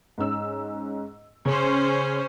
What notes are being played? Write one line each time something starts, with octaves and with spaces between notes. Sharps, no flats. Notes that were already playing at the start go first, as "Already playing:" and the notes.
G#2 C#4 E6
C#3 C#4 C5